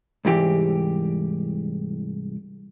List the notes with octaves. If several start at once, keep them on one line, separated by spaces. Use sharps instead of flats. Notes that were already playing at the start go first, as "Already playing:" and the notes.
C2 G#2 E3 G4